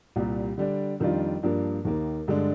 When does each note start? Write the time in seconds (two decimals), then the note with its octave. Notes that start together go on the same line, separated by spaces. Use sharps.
0.16 C2 A#2 G3
0.58 D3 G3 D4
1.00 F2 D#3 G3 D4 F4
1.43 G2 F3 A#3 D4
1.85 D#2 D#3 A#3
2.28 G2 D3 G#3 D4